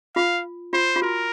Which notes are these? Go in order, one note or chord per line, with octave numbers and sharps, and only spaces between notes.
F4 F5
F4 C5
F4
F#4 A#4